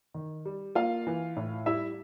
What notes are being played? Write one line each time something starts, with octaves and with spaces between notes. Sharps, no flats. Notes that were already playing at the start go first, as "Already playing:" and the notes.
D#3
G3
A#3 F4 F5
E3
A2
G3 E4 E5